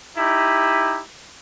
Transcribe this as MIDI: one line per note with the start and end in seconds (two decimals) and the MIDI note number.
0.17 1.00 63
0.17 1.00 64
0.17 1.00 67